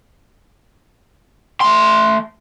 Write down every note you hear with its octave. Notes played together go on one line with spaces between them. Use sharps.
A3 C6